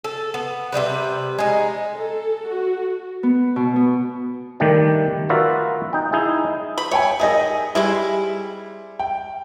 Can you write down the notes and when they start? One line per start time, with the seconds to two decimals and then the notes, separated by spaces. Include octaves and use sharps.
0.04 A4
0.34 B3
0.72 C3 D#3 G3 B4
1.39 G#3 D#4
1.93 A4
2.49 F#4
3.23 B3
3.56 B2
3.76 B3
4.60 D#3 G3 A3 D4 G4 D5
5.29 F4 F#4 A#4 B4 D5 E5
5.93 D#4 G5
6.13 D#4 E4 G#4
6.78 B5
6.91 C#5 E5 G5 G#5
7.20 D#3 G#4 D#5 E5
7.75 G3 G#3 C4 E4
8.99 G5